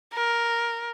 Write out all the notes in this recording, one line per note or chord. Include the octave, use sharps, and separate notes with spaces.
A#4